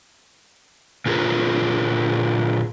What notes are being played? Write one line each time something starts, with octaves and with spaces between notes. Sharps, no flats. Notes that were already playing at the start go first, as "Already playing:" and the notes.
A#2 D3 F4 G#4 A#4 B4